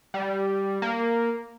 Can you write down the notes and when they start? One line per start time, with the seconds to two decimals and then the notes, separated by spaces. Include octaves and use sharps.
0.14 G3
0.82 A#3